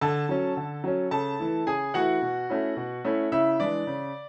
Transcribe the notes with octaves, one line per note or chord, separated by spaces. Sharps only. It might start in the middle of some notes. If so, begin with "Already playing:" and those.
D3 A4 A5
F#3 C#4
D3
F#3 C#4
C#3 A4 A5
E3 A3 E4
C#3 G#4 G#5
E3 A3 E4 F#4 F#5
B2
A3 C#4 E4
B2
A3 C#4 E4
C#3 E4 E5
E3 G#3 D4 D5
C#3